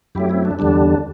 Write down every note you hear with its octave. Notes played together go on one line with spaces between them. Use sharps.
F#2 F#3 A3 E4 G4
C4 E4
D4
E2 D3 G3 D4